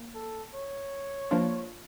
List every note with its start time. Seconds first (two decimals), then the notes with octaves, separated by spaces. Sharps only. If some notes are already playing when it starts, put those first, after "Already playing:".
Already playing: A#3
0.15 A4
0.54 C#5
1.31 F3 A#3 D4 F4